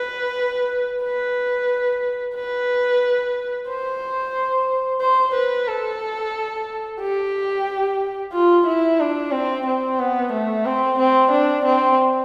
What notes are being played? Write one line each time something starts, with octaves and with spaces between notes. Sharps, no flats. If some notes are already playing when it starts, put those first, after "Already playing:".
Already playing: B4
B4
B4
C5
C5
B4
A4
G4
F4
E4
D4
C4
C4
B3
A3
C4
C4
D4
C4